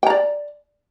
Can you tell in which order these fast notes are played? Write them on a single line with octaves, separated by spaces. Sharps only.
G5 A#5 D5